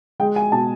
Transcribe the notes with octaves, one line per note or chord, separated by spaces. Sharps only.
G#3 G5
G#5
B2 A5